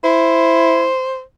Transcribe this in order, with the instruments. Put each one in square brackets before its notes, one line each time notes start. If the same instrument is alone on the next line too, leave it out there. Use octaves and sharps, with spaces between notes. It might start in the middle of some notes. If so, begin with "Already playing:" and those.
[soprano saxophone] E4 [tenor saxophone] C5